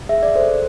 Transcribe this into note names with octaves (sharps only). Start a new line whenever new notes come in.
G#4 E5
D5
A4 C5